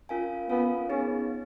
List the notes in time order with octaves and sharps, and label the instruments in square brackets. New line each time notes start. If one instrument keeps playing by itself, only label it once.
[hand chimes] C#4 F4 A#4 F5 G#5
[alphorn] B3 [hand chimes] C#4 F4 A#4 F5 G#5
[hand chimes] B3 D#4 G#4 [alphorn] C#4